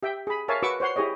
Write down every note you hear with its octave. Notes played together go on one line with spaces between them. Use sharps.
G4 E5 G5
G#4 B5
A#4 C#5 E5 F5 G#5 A5
F#4 B4 C#6 D6 E6
C5 C#5 F#5 C6
E4 G4 G#4 C#5 D#5